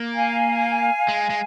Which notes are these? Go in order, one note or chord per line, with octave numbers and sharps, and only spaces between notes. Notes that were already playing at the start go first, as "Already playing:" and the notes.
Already playing: A#3
F5 G#5
G#3
G#3